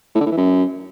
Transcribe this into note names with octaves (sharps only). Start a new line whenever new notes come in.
A2
D3
A2
E3
F#2